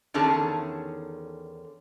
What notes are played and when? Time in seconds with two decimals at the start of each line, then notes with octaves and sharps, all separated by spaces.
0.14 E2 D3 D#3 C#4 G#4 A5